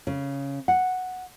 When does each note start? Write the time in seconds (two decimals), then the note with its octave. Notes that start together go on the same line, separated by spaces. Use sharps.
0.07 C#3
0.68 F#5